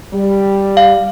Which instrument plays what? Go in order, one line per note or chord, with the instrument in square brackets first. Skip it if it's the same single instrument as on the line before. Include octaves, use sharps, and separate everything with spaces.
[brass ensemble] G3
[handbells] F5